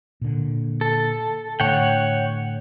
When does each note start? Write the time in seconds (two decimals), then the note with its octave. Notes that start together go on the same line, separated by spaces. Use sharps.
0.21 A#2 D3
0.81 A4
1.60 A2 D3 C#5 F#5 G5